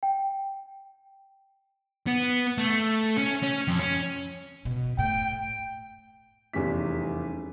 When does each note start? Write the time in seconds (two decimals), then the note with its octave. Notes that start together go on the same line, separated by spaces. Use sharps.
0.03 G5
2.07 B3
2.58 A3
3.17 C#4
3.43 C#4
3.68 F2
3.79 C#4
4.65 B2
4.98 A2 G5
6.54 F1 E2 G3 C#4 B6